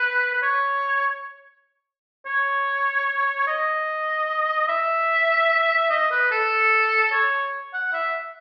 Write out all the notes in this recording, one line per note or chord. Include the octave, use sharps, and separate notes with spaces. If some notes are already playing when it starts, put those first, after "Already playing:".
Already playing: B4
B4
C#5
C#5
D#5
E5
D#5
B4
A4
C#5
F#5
E5